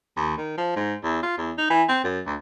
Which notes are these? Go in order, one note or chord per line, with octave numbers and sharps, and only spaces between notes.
D#2
D#3
F3
G#2
E2
F4
E2
D#4
E3
C4
F#2
D2